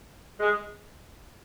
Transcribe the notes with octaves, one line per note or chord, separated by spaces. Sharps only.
G#3